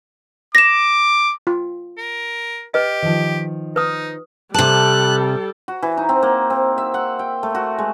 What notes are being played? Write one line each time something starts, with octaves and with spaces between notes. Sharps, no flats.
D6 A#6 E7
F4
A#4
G4 B4 D#5
D#3 F3
D#4 B4 D#6
C3 G3 A4 A5 F#6
F#4
E3
D#4
C4
A#3
C4
E5
F#5
G5
A3
F#4
G#3